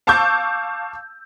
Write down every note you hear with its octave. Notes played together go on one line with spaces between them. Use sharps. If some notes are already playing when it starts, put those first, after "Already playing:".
F5 A5 C#6 D6 E6 G6